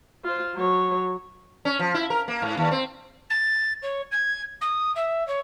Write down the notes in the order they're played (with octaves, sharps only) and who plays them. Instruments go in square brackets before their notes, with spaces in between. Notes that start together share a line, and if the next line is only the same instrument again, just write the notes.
[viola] F4 C5
F#3 C#5
[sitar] C#4
F3
E4
A#4
A#3
G#2
D#2
C4
[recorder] A6
C#5
G#6
D#6
E5
C#5